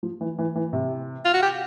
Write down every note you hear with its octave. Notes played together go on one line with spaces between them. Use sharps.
F3
E3
E3
E3
C3
F4
F#4
G4